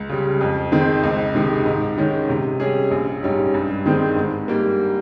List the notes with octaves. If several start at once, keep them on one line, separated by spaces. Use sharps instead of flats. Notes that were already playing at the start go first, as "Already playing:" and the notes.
Already playing: C#2
C#3 G3
F2
D#3 G#3 C4
C#2
C3 D#3 G#3
G#2
D#3 G#3 C#4
C3
G3 C#4 G#4
A#1
G#2 G3 C#4
G2
D#3 G#3 C4
G#2
G3 A#3